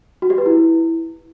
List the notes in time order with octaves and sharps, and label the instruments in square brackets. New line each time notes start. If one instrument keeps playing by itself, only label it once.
[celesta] F#4
G4
B4
E4